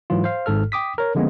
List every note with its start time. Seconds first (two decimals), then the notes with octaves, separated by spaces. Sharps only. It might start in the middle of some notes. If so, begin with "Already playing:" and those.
0.10 G#2 E3 F#3 F4
0.24 C5 F5
0.46 G#1 G#2 A4 F6
0.72 G5 D6 D#6 B6
0.98 A#4 C#5
1.15 D3 F3 G#3 A#3 B3 C#4